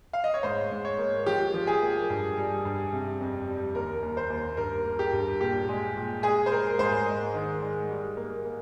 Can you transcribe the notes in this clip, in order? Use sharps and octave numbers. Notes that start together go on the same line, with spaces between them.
F5
D#5
C#5
G#2 C5
G#2
C#5
A#3
F3 G4
F3
G#4
A#3
G2
G3
G2
C3
F2
G3
D#2 A#4
D#2
C5
D#2
G2 A#4
A#3
G4
G2
A#2 G4
G#3
A#2
G#3 G#4
C5
G#3 A#4
G#2 C5
G#3
D#3
G#3
G3
A#3
A#3